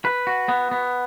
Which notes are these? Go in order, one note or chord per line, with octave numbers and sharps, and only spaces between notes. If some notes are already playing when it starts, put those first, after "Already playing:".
B4
F#4
B3
B3